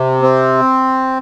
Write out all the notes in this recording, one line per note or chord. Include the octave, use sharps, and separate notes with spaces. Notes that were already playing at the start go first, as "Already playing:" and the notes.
Already playing: C3
C4